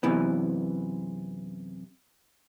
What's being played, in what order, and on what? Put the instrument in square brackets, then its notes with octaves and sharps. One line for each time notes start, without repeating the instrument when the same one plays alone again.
[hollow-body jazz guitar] F#2 C3 E3 B3